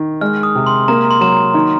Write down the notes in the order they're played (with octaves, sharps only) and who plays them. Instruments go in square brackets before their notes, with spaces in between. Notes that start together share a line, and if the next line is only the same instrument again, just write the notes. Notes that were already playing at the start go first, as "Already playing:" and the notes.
Already playing: [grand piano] D#3
[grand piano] G#3 [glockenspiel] F6
[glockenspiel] D#6
[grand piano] C3
[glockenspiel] C6
[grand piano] A#3 [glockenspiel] A#5
[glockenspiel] C6
[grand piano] F#3 [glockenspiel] A#5
[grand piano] D#3